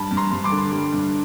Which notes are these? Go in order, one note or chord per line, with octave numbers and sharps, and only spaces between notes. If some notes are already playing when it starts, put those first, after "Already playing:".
Already playing: G2 A5 B5
G2
A#5 C6
G2
C6 D6
D3
G3
G2